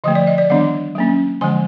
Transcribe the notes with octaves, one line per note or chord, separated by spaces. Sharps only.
D3 F3 A3 D#5
D5
D#5
D5
D#3 G3 B3 D4 D#5
F#3 A#3 C#4
D3 F3 G#3 G#5